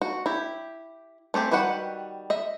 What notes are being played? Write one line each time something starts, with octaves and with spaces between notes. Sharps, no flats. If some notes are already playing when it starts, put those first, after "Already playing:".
F#4
E4 G4
A3 C4 G4 G#4
D#3 G3 F#4 B4 F#5
D#5 E5